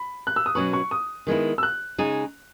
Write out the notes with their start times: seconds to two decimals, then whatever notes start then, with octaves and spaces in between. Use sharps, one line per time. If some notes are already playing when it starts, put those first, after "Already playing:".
Already playing: B5
0.27 F#6
0.36 E6
0.46 D#6
0.55 B2 F#3 C#4 F#4 B4 C#6
0.73 C#6
0.91 D#6
1.27 D#3 G#3 B3 E4
1.58 E6
1.63 F#6
1.98 C#3 G#3 D#4 G#4